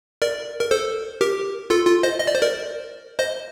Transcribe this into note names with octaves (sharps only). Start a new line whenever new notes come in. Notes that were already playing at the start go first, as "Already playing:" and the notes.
A#4 D5
A#4
A4 C5
G4 A#4
F4 A4
F4
C5 D#5
D#5
D5
C5
A#4 D5
C5 D#5